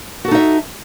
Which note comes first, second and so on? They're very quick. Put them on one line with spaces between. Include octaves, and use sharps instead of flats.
F#4 A4 D#4 E5